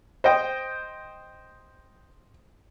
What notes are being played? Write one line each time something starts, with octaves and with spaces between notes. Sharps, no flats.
C5 D#5 G5